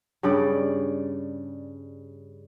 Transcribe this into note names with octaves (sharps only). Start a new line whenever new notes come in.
G2 C#3 G3 D5